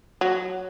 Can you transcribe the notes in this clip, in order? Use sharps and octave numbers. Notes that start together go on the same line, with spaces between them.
F#3